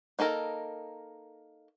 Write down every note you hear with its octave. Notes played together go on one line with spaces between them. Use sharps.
A#3 D#4 A4 A#4